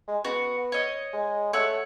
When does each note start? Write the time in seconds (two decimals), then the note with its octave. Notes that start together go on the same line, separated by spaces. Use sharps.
0.08 G#3
0.24 B3 F#4
0.72 C#5 D#5
1.13 G#3
1.53 A3 C#5 F#5 E6